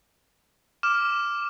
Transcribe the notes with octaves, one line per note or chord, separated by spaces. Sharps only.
D6 F6 E7